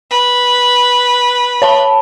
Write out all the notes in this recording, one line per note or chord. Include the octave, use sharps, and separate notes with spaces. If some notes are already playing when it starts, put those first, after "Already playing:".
B4
C#5 A5 B5